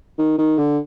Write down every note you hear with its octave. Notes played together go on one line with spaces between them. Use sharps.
D#3
D#3
D3